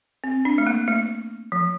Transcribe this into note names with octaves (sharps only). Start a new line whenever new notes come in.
C4
D4
A3
A#3
A3
F3